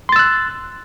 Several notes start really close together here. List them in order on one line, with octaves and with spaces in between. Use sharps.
C6 A6 E6 F#6